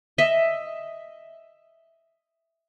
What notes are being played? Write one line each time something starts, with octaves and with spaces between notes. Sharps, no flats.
D#5 E5